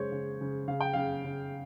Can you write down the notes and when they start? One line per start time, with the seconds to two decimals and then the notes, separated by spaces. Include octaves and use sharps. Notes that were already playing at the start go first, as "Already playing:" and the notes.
Already playing: C#3 G#3 C5 C#5
0.12 C#3
0.41 C#3
0.68 C#3 F5
0.81 G5
0.93 C#3 F5
1.24 C#3